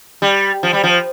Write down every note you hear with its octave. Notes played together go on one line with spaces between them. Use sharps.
G3
F3
G3
F3